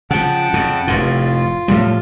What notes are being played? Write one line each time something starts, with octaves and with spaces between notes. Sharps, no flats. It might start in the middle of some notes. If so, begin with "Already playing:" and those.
C#3 F3 F#5 G5 A5
F2 C#3
F1 F2 A2 F4
A2 F3 G3